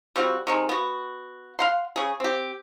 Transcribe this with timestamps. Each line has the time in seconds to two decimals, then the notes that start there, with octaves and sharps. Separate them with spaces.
0.16 G3 C4 F4 F#4
0.47 C3 D#3 G#3
0.69 B3 F#4
1.59 F5 F#5 C6
1.96 C#3 G#4
2.20 C4 G4